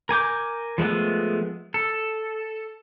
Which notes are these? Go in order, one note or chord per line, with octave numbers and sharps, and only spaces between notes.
A#4 G#5 D6 G6
F3 G#3 A3 B3
A4